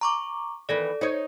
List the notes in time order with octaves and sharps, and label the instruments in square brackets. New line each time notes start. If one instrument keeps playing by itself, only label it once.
[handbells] A#5 C#6 D6
[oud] D#3 E3 B3 [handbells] A4 D5
[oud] D#4 C5 C#5